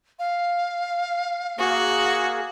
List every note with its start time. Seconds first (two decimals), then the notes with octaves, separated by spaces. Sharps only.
0.19 F5
1.59 A#3 F#4 G#4